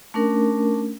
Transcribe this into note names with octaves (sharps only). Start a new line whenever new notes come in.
A3 C#4 D4 A#4